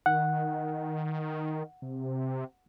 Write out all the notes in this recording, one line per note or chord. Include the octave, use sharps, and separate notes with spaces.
D#3 F#5
C3